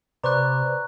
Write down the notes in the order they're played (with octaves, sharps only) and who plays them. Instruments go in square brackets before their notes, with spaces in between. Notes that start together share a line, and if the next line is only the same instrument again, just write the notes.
[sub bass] C3 [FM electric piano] B4 C5 D5 [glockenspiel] A#5 C#6 F#6